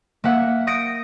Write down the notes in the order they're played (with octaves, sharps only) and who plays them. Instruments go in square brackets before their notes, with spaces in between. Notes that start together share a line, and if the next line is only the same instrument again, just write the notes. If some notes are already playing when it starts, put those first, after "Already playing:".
[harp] A#3 E5 F#5
D#6 G6 A#6 C#7 D7